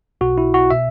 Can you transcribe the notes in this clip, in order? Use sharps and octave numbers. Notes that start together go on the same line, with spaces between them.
B1 B2 F#4
E4
F#4
B2 E5